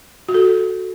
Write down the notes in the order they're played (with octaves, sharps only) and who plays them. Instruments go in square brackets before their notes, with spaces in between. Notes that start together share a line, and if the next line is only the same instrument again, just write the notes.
[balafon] F#4
A4